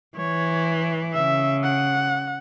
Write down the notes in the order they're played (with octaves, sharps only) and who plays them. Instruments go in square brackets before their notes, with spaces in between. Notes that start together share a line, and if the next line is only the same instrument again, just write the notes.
[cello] E3 [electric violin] C#5
[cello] C#3 [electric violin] E5
[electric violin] F#5